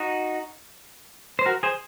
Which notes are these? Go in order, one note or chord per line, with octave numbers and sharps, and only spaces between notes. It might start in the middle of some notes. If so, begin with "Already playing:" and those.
Already playing: D#4 F#4
C5
F#4 A#4
G#4 C5